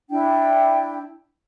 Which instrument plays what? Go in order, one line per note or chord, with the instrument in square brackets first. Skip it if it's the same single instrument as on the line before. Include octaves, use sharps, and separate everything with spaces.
[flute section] D4 E4 G5